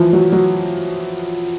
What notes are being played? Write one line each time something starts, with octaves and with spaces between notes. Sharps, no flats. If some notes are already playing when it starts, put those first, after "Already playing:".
Already playing: E3 F3
F#3
F#3